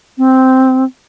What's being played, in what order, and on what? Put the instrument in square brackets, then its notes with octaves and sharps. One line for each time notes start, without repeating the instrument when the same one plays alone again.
[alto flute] C4